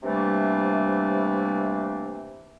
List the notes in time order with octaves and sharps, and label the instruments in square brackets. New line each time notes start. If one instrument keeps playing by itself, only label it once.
[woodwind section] C3 E3 G3 A3 A#3 D4